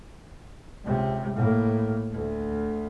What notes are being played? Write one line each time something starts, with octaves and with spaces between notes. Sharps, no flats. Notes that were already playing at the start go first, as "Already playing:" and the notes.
C#2 C3
A2 A#3
D2